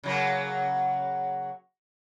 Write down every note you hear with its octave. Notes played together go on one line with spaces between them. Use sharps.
C#3 F#3 A#3